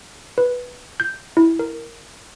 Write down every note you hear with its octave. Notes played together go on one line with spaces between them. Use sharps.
B4
G6
E4
A#4